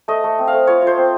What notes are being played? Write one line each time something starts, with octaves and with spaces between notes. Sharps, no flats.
A3 D#5
A3
C4
F5
A3
F4 C#5
F4
C5
C4